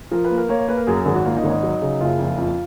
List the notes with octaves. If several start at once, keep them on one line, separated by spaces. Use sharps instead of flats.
F3 A#4
B4
A#3
A#4
A#3 C#5
C#5
A#3 B4
A#4
F#2 G#4
A#4
G#1 G#4
F#4
A#3 F4
D#4
G#1 C#4
D#4
F#3
C#3
F#1 F4
F2
F2